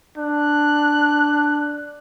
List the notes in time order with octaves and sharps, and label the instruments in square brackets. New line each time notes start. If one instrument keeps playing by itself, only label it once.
[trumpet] D4 [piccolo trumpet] F#6